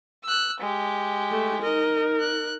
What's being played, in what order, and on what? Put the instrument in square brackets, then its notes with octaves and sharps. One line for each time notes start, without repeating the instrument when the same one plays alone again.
[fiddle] E6 F#6
G#3 G4
[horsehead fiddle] A3
[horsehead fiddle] D#4 A#4 [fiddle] D#5
[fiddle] F#6